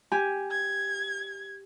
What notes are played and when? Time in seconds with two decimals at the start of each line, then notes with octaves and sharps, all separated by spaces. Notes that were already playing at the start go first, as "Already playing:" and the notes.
0.12 G4 G#5
0.51 G#6